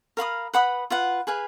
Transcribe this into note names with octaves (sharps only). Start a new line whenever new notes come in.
A#4 F5 B5 D#6
B4 F#5 B5 D#6
F4 B4 F#5
G#4 B4 F5 G#5